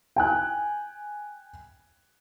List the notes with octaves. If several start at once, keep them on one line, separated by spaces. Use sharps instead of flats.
G5 G#5 F#6